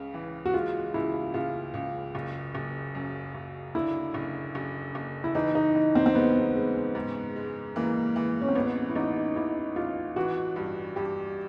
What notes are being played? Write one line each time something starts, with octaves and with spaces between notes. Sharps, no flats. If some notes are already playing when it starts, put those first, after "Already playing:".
Already playing: C#2 C#3
E3
F#4
G#3 F4
C#2 E4
C#2 F4
C#2
F#1
F#1
F#2
F#1
D3 E4
F#1
F#1
F#1
E4
E3 D#4
D#4
E3
C4
C4
G#2 B3
G#3
G#2
G#3
E3 A#3
E3
C#4
C4
A1 B3
E4
A1 D#4
A1 E4
A1 F4
E3 F#4
G2
G2 G4